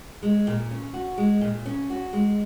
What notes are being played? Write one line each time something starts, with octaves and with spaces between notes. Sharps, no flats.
G#3
A#2
C#4
F#4
G#3
A#2
C#4
F#4
G#3